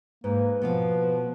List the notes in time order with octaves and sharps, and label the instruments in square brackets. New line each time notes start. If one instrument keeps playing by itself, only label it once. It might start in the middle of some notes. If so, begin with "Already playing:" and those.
[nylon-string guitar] G#2 [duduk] A#3 [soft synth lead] B4
[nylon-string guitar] B2 B3 F5 [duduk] F3